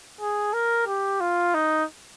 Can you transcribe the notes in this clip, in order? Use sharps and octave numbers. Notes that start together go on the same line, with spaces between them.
G#4
A#4
G4
F4
D#4